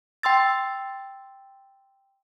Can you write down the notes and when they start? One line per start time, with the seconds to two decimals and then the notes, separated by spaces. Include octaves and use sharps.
0.23 G5 C6 E6 A6